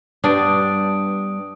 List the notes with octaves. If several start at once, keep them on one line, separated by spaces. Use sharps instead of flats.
G2 B3 D4 D6 D#6 D7